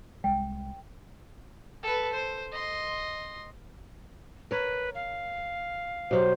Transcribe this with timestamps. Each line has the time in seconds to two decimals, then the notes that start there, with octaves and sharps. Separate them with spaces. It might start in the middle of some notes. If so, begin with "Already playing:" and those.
0.24 C2 G#3 G5
1.83 A4 B4
2.13 C5
2.52 D#5 C6
4.51 A#4 B4 C#5
4.95 F5
6.11 B2 F#3 G4 C5